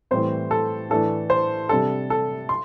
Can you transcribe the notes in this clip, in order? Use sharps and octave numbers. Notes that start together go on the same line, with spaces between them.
A2 E3 G3 C4 C5
A4
A2 E3 A3 D4 A4
C5
C3 G3 D4 A4
A4
C6